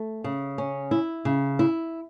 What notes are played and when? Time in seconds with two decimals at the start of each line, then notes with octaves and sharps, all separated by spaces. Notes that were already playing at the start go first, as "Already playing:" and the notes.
Already playing: A3
0.24 C#3
0.58 C#4
0.91 E4
1.25 C#3
1.59 E4